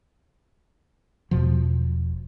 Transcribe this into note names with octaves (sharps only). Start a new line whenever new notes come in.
E1 E2 B2 F3